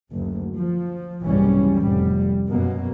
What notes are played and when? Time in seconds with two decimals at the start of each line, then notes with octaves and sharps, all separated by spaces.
0.12 F#1 D2
0.56 F3
1.22 F#1 C2 G#2 E3 G3 C#4
1.76 F1 A2 G3
2.48 F#2 B2 A#3